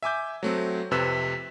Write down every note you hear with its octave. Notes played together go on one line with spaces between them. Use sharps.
E5 G#5 D6 G6
F#3 A3 C4
F2 C3 B4 E6 E7